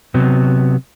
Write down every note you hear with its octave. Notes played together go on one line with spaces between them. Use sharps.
C3 F#3 B3